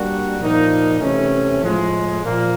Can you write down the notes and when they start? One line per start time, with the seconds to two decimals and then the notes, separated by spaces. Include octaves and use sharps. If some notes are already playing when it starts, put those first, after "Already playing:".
Already playing: G3 A#3 D4 F#4
0.39 A#2 F3 A#3 D#4
1.00 C3 E3 A3 C#4
1.62 A2 F3 G#3
2.22 A#2 F3 A#3